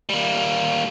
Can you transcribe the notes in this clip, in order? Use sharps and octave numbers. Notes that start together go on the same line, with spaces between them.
G3 A#3